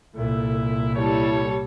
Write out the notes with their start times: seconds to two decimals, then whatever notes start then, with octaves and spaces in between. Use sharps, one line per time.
0.15 C2 A#2 E4 A4
0.95 G3 E4 A4 C#5